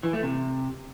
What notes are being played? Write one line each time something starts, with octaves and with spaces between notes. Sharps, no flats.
E3
A3
C3